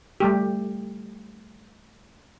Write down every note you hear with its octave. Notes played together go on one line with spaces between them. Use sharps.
G3 A3 G4